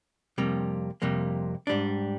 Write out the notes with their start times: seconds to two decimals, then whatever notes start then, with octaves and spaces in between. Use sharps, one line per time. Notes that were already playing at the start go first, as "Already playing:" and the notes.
0.38 F2 C3 G3 A#3
1.02 F2 C3 G3 A#3
1.67 G#2 G3 D4